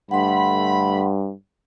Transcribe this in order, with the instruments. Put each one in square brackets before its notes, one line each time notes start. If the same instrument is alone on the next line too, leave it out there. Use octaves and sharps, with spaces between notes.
[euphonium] G2 [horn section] D3 A3 B5 [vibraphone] F#5 C6